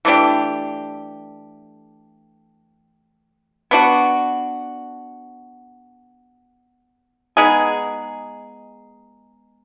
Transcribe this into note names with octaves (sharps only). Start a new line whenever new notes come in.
E3 A3 D4 G4
B3 D4 F#4
G#3 B3 D#4 G#4